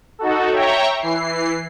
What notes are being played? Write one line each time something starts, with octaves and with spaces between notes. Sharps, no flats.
D#4 F#4 A4
C#5 E5 G5 A#5 C#6
E3 C7